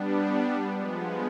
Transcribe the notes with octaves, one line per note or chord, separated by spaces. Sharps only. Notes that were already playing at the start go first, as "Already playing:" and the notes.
Already playing: G3 B3 D4
F3 G#3 B3